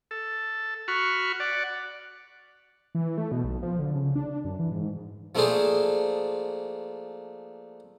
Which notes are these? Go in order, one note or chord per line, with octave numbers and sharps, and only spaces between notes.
A4
F#4 B5 C#6 F6
D5 F#5
E3
A3
B2
B1
F3
D3
C#3
D4
F#2
E3
G#2
F3 A3 A#3 D4 G#4 C5